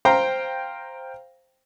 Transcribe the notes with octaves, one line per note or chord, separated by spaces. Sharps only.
C5 F5 G5 A#5